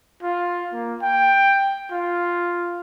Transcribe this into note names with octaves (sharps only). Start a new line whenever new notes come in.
F4
A#3
G5
F4